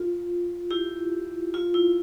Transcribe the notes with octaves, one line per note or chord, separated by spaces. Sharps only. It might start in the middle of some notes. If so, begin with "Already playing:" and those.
Already playing: F4
E4 G4
F4
E4